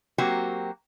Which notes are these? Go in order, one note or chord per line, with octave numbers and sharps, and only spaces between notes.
F#3 A#3 C4 F#4 G4